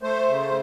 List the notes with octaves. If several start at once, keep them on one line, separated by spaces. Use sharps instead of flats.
A3 C5
C#3